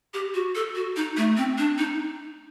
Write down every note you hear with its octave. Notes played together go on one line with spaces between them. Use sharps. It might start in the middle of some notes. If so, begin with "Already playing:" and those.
G4
F#4
A4
F#4
D#4
A3
C4
D4
D#4